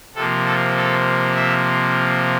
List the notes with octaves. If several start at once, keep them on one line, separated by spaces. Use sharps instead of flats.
C3 F3 A#3 A4
A4
A4
E5